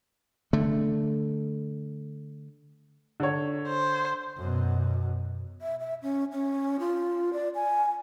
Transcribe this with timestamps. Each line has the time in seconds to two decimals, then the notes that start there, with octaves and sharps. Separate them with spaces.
0.53 D3 A3
3.20 D3 C#5
3.69 C5
4.37 F#2 B2
5.61 E5
5.80 E5
6.02 C#4
6.32 C#4
6.79 F4
7.33 D5
7.55 G#5